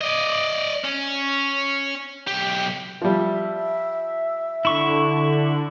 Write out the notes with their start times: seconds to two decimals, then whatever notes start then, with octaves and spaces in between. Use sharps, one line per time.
0.01 D5 D#5
0.84 C#4
2.27 B1 G4
3.02 F3 G3 E5
4.65 D3 E4 C#6